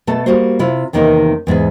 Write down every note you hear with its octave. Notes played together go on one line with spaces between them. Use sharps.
B2 A3 A4 A5
G3 A#3 F#4 C5
C3 E4 F4
E2 C3 D#3 A#3 D#4
E2 G#2 B3 G#4